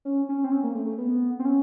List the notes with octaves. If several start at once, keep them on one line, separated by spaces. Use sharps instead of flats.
C#4
C#4
C4
C#4
A#3
A3
A3
B3
C4
C#4